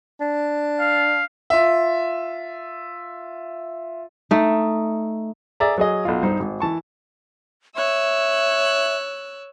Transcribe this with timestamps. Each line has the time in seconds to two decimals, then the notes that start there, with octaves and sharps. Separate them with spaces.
0.20 D4
0.79 F5
1.50 F4 E5
4.31 A3 D#4
5.60 G#4 D5 E5 A#5
5.78 F#3 G#4 D#5
6.05 B1 F4
6.23 G2 D#4 C5
6.40 G#1
6.60 E3 A5 C#6
7.76 C#5 E5 E6 F#6